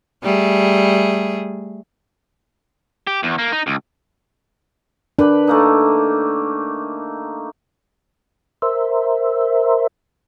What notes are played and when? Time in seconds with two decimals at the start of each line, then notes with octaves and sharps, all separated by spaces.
0.23 G3 A3 G#4
3.07 G4
3.23 E2
3.39 A#3
3.52 D#4
3.67 C#2
5.19 D4 G4 A#4 B4
5.47 A3 A#3 D#4
8.62 A#4 C5 E5